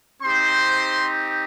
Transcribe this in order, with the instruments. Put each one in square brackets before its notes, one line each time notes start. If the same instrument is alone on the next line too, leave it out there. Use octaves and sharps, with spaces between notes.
[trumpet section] C4 D#4 G4 C5 C6